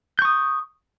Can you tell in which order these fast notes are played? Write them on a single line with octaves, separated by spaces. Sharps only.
G6 C#6 D#6